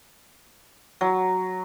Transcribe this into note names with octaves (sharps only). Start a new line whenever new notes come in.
F#3